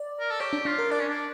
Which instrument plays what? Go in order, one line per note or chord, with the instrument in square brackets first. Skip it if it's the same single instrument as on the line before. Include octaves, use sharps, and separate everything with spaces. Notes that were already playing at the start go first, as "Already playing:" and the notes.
Already playing: [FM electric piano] D5
[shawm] A#4
A4
[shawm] G4 [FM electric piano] C#5
[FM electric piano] D4
[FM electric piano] D4 [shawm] F4
[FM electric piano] A#4
[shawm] D4 [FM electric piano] D5
[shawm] C#4
D4